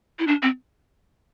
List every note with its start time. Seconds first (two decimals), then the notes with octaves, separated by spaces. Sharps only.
0.19 E4
0.27 D4
0.42 C4